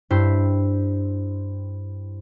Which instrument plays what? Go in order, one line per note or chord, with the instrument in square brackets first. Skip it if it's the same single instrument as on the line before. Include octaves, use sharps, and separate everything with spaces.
[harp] G2 E4 C5